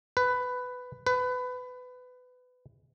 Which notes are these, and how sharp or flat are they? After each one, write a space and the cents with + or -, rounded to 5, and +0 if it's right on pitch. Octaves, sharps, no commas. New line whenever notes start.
B4 +10
B4 +20